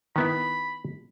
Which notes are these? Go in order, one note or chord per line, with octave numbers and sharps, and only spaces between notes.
D#3 B3 E4 B5